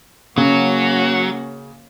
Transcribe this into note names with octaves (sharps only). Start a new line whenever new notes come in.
C#3 F#3 A#3 C#4 F#4